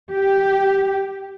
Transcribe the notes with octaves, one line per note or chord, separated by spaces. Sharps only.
G4